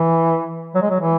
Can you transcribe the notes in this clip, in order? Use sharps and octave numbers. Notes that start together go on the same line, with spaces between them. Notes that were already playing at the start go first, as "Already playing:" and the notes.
Already playing: E3
F#3
G#3
F#3
E3